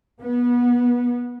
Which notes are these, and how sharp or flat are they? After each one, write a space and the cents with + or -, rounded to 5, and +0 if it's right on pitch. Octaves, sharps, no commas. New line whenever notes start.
B3 -25